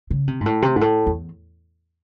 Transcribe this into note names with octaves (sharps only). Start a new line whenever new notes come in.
C#3
C3
G#2
A2
C3
G#2
A2
E2